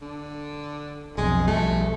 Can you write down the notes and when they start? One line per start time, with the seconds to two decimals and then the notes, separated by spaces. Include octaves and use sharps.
0.01 D3
1.18 B1 F2 G#3
1.47 B1 F3 G3 A3